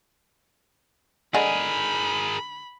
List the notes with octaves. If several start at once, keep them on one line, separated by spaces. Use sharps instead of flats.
D3 G#3 G#4 A#4 G#5 B5